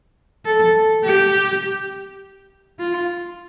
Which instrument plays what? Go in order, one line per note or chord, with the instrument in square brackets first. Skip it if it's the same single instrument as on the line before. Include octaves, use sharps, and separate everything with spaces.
[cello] A4
G4
F4